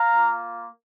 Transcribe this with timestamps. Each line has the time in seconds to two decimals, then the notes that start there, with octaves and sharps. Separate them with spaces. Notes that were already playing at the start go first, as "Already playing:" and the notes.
Already playing: F5 A#5
0.13 A#3 F4